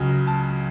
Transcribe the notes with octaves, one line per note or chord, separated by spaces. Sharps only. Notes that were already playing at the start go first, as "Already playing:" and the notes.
Already playing: C#2 C#3 F#3 G#5
A5